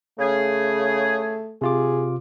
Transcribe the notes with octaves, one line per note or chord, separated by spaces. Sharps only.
C#3 A3 G#4
C3 F4 G#4 D6